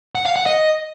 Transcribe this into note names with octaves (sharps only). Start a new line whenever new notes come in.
F#5
F5
F#5
D#5